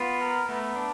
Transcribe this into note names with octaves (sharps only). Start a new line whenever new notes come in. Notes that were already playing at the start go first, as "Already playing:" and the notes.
Already playing: B3 F4
A#4
A3 B3
D4